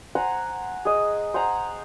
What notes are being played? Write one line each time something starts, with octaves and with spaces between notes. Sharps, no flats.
C5 F#5 G#5 A#5
G#4 D#5
C5 F#5 G#5 A#5